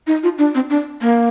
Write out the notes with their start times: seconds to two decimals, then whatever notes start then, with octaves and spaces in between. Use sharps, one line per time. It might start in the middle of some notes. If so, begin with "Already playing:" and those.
0.07 D#4
0.23 F4
0.38 D4
0.55 C4
0.70 D4
1.01 A#3